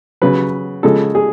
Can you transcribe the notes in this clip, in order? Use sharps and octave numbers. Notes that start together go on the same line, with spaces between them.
C#3 F#3 B4
C#3 F3 G#3 A4
G#4